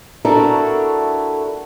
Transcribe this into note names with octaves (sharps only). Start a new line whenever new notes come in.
A3 D4 E4 F#4 A4 A#4